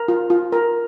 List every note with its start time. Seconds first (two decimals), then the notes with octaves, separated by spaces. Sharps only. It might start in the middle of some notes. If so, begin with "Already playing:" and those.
Already playing: A#4
0.08 F4
0.30 F4
0.52 A#4